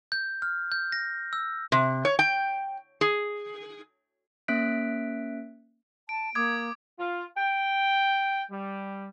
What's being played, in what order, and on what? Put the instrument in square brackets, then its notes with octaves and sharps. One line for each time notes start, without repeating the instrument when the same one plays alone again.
[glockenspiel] G6
F6
G6
A#6
E6
[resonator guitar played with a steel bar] C3
C#5
G5
G#4
[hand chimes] A#3 C#4 E5 F#6 B6 D7
[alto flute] A5 [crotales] D7
[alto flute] A#3 [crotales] D6 D#6 G#6
[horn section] F4
G5
G3